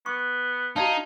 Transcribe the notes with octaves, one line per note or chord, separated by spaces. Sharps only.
B3 C#6
D#4 F#4 D5 F5 A5